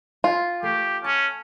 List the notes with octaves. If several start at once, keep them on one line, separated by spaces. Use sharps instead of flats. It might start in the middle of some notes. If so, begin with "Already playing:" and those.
F4 F5 G#5
A3 G4 C7
C#4 A5